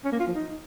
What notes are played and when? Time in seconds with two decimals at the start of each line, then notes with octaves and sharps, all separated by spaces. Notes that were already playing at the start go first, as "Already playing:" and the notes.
0.05 C#4
0.12 A#3
0.20 F4
0.27 F3
0.35 D#4